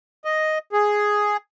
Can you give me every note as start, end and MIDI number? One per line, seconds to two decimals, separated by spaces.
0.25 0.58 75
0.73 1.37 68